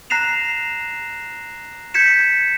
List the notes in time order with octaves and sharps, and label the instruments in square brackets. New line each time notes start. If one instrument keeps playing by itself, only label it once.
[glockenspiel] A#5 F#6 A#6 C7 E7 F7
G6 G#6 B6 C#7 E7